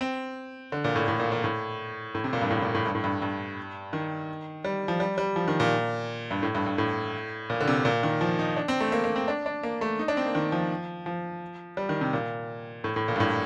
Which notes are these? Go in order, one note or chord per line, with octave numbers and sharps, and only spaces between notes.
C4
D3
A#2
A2
A2
A#2
A#2
A2
A2
C3
A#2
G2
A2
A#2
A2
G2
A2
G2
G2
D#3
G3
F3
G3
G3
F3
D#3
A#2
G2
A2
G2
G2
A2
A#2
D3
C3
A#2
D#3
F3
D#4
D4
C4
A3
A#3
A#3
C4
D4
D4
A#3
A3
D#4
D4
C4
A#3
D#3
F3
F3
G3
D#3
C3
A#2
A2
A2
A#2
G2
A2